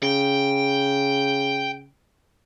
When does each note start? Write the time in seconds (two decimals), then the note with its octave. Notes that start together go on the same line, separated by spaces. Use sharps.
0.03 C#3 G5